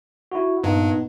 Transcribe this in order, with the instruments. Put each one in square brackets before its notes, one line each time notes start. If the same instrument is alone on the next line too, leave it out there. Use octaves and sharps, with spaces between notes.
[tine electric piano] E4 F#4
[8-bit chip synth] G2 [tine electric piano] A#2 B3 D#4